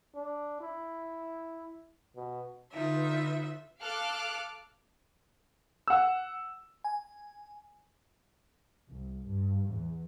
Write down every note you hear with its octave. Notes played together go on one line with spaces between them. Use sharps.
D4
E4
B2
D3 D#4 F4 B4 E5
A4 F5 D6 F6 F#6
F#5 E6
G#5
C2
G2
E2